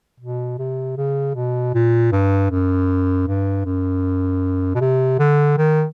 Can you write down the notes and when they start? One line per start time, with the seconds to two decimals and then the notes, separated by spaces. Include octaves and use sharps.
0.20 B2
0.59 C3
0.97 C#3
1.35 B2
1.74 A#2
2.12 G2
2.51 F#2
3.27 G2
3.66 F#2
4.75 B2
4.81 C3
5.19 D3
5.58 D#3